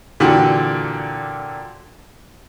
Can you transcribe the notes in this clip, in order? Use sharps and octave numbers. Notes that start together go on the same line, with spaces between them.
A#2 D3 E3 F#4 G4